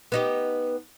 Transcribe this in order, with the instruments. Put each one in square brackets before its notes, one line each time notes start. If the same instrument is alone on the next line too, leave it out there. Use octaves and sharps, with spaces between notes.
[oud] B3 D#4 G4